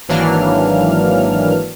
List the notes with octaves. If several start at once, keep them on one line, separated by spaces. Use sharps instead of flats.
G#1 E3 F#3 A#3 D4 F6